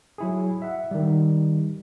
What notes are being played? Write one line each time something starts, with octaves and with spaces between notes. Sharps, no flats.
F#3 E4 G#4
E5 F#5
D#3 G3